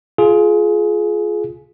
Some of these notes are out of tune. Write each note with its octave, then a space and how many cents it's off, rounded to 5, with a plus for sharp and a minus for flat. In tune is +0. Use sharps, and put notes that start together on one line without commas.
F4 +0 G#4 +25